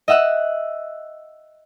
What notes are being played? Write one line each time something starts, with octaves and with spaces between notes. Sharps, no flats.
D#5 E5 F#5 E6